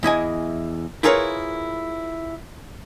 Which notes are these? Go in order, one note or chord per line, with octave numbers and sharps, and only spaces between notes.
E2 E4 D#5 G#5
E4 F4 G#4 A#4 B4 C#5